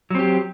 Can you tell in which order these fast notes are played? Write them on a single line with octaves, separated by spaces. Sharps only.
F#3 C4 G4